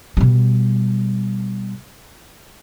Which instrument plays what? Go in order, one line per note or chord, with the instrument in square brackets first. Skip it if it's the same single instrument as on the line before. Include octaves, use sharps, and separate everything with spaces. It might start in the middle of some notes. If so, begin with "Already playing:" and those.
[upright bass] B2 G3